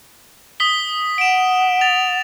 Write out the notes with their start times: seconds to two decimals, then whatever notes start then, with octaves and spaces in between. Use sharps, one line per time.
0.60 D#6 B6 G7
1.18 F#5 D7 E7
1.81 A6 F7